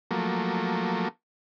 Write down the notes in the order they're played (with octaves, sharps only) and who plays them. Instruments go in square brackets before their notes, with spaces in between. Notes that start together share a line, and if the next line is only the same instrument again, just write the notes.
[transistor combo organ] F3 F#3 A3 A#3